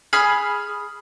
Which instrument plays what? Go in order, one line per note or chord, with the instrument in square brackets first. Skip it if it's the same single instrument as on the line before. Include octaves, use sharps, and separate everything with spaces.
[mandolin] G#4 B5 F6